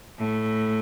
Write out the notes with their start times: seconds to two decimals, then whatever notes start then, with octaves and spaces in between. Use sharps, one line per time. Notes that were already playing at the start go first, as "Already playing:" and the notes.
0.19 A2